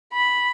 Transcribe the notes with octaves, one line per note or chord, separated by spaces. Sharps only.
B5